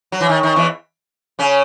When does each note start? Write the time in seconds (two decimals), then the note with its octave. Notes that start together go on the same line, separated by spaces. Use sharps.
0.12 F#3
0.20 E3
0.29 D#3
0.43 D#3
0.56 E2 E3
1.39 C#3 C#4